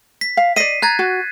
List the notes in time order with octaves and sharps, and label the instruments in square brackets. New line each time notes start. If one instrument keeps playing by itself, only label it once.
[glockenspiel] B6
[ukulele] F5
[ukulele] D5 D#5 [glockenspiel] B6 C7 D#7
[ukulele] A#5 [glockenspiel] F#6 G#6 A6
[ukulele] F#4